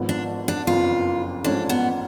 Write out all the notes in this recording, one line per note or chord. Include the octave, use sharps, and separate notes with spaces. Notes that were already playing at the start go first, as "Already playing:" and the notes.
Already playing: G#1 G#2 F3 B3
D4
D4
F#1 F2 F3 B3 F4
A1 G#2 F3 A3 C#4 D4
B3